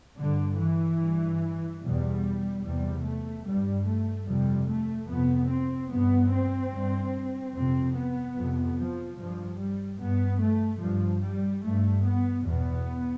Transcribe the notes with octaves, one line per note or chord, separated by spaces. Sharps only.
G2 D3
E3
G2
E2 B2 G3
E2 C3 G3
A3
G2 G3
A3
F2 C3 G3
A3
F2 C3 B3
C4
G2 B3
C4
G2
F2 C3 C4
B3
F2 C3
F3
G2 F3
G3
G2 B3
A3
G2 F3
G3
G2 A3
B3
E2 B2 B3